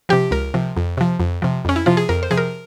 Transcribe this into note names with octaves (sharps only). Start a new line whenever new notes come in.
C3 F3 G4
C#2 A#4
C3 F3
F2
C3 F3
F2
C3 F3
F2 C#4
E4
C3 F3 F4
G#4
F2 A#4
C5
C3 F3 G#4
A#4